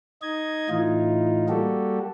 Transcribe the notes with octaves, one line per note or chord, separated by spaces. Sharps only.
D#4 D#5 G#6
A2 E3 D#4 F4
G3 A#3 F#4 G4 A4